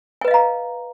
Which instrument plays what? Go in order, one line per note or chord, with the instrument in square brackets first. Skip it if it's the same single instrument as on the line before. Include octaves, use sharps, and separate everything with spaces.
[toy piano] G#5
B4
D#5
F5
A#5